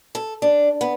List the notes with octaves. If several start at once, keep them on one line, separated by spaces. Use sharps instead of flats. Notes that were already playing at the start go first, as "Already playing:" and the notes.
A4
D4
B3